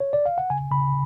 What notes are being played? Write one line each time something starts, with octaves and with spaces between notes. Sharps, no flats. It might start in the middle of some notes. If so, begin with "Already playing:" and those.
C#5
D5
F5
F#5
C#3 G#5
C#3 B5